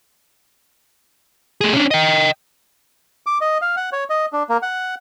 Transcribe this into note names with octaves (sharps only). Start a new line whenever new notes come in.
A3 G#4
C#4 D4
D#5 G5
D6
D#5
F5
F#5
C#5
D#5
D4
A#3
F#5